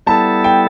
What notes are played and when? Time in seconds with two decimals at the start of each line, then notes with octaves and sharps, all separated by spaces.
0.07 G3 B3 E4 A4 A5
0.44 G5